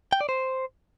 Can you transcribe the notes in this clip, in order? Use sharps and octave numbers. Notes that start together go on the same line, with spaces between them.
G5
D5
C5